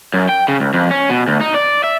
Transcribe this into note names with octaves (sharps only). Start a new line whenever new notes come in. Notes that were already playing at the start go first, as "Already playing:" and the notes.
F#2
G5
C#3
C#2
F2
C#4
B2
D2
D#4
D5
E5